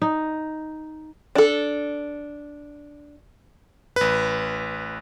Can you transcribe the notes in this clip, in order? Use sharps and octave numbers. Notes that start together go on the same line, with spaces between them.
D#4
D4 A4
A1 B4